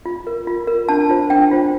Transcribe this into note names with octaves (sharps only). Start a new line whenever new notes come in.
F4
A#4
F4
A#4
D4 A5
F4 C5
D4 G5
F4 C5